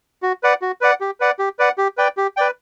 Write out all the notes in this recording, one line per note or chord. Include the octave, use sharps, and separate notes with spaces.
F#4
B4 D5 F#5
F#4
B4 D5 F#5
G4
B4 D5 F#5
G4
B4 D5 F#5
G4
B4 D5 G5
G4
B4 D5 G5